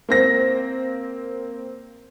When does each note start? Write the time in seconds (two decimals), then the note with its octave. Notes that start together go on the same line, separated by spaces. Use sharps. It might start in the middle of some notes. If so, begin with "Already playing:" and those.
0.09 A#3 C4 A#6